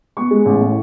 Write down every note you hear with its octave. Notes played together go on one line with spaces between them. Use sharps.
B3 C#6
G#3
A1
A2